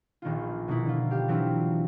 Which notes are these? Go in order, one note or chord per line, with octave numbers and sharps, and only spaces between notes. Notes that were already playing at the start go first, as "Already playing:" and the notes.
A#1 D#3 B3 F4
B2 A#3 D#4 E4
D3 F4
G4 F5
E3 F#3 C4 D4 E4 F4